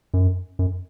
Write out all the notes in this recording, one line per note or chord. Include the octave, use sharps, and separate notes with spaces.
F#2
F#2